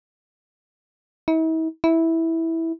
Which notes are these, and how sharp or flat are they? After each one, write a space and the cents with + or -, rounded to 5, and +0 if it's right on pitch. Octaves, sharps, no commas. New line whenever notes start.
E4 -45
E4 -10